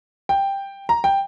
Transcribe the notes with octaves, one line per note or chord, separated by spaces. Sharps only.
G5
A#5
G5